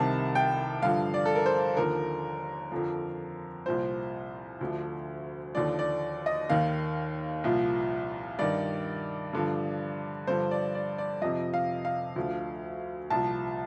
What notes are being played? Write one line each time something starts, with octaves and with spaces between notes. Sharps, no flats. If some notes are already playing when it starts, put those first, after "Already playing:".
Already playing: C2 C3 D#3 A5
G5
G2 D3 F3 F5
D5
A4
A#4
C5
D#2 D3 F3 A#4
F2 D3 F3
C2 A#2 F3 C5
D2 D3 F3
D#2 D3 F3 D5
D5
D#5
D#2 D#3 F5
C2 A#2 F3
G2 D#3 D5
G2 D3 F3
G2 D3 F3 C5
D5
D5
D5
F2 C3 F3 D#5
F5
F5
D2 D3 F3
C2 A#2 F3 A5